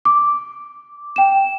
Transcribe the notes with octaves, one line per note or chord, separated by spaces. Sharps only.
D6
G5 E7